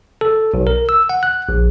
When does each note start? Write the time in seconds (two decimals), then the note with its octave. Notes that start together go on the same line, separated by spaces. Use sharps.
0.21 A4
0.54 B1
0.67 A#4
0.89 E6
1.09 F#5
1.23 F#6
1.49 A#1